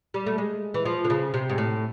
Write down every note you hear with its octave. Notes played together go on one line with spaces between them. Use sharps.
G3
A3
G#3
E3
F3
D3
C#3
C3
G#2
A2